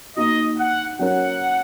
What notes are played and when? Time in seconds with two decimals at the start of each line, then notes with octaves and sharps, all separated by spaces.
0.17 A#3 D#4 F#4 D#5
0.58 F#5
0.99 F#3 C#4 A#4 F#5